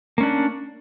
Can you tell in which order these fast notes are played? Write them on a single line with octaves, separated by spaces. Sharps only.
A#3 C#4 D4